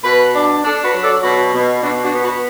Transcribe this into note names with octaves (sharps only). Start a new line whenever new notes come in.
B2 F#4 B4
D4
D4 A4 D5
F#4 B4
F#3
A4 D5
B2 F#4 B4
B2
B2 D4 F#4
D4 F#4
B3
F#4 B4